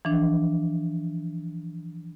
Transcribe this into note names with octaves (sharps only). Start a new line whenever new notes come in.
E3 F3 D4